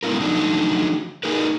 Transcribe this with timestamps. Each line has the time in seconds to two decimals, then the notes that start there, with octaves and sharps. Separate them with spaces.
0.03 G#3 B3 E4 F4 A#4
0.20 D3 F3 F#3 A3 D4 D#4
1.23 A#3 D#4 G#4 A#4 B4